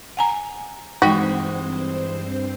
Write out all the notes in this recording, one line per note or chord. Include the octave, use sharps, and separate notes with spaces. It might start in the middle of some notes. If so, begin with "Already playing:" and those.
F#5 G#5 A#5
G2 E3 G#3 C4 D#4 F#4 C5 G5